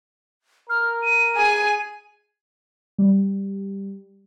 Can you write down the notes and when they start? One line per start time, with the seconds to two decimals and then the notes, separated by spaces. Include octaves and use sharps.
0.70 A#4 F6
1.02 D#7
1.36 G#4 G#5
2.98 G3